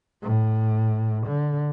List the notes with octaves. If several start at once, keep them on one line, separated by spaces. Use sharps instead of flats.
A2
D3